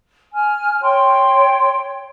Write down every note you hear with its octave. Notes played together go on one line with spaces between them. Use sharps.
G#5 F6
C#5 G5 C6